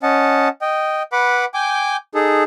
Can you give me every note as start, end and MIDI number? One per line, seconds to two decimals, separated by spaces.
0.03 0.49 61
0.03 0.49 75
0.03 0.49 78
0.03 0.49 81
0.61 1.03 75
0.61 1.03 79
1.12 1.45 71
1.12 1.45 78
1.12 1.45 83
1.12 1.45 86
1.54 1.97 79
1.54 1.97 80
1.54 1.97 86
1.54 1.97 91
2.15 2.44 63
2.15 2.44 68
2.15 2.44 69